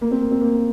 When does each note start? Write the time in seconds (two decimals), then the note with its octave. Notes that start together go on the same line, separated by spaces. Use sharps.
0.01 A#3
0.11 C4
0.21 A#3
0.31 C4
0.41 A#3